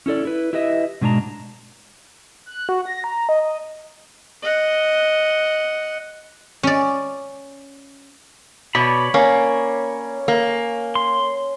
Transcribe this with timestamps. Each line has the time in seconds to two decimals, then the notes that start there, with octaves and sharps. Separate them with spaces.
0.06 C#4 E4 A4 D5
0.25 E4 B4
0.53 E4 G4 B4 D#5 E5
1.01 G#2 B2 G#3 D4 A5 A#5
2.46 F#6
2.69 F#4
2.85 A#6
3.04 A#5
3.29 D#5
3.41 D#5
4.43 D#5 F#5
6.63 C#4 D5
8.75 B2 C#5 D5 B5
9.14 A#3 C#4
10.28 A#3
10.95 C6